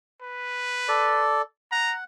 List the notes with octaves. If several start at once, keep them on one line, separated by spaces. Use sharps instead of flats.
B4
A4 D5
F#5 A#5